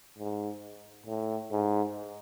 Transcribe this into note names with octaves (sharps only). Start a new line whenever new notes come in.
G#2
A2
G#2